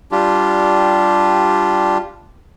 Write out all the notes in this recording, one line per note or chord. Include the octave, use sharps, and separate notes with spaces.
G3 D4 F4 G4